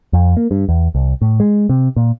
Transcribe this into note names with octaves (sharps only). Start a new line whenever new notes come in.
F2
A#3
G2
E2
C2
A2
G#3
C3
A#2